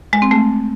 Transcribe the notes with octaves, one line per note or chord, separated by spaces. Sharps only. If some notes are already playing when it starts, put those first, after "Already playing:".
G#3
C4
A3